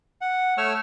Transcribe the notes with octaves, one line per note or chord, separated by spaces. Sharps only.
F#5
A3 C#5 C#6 E6 F6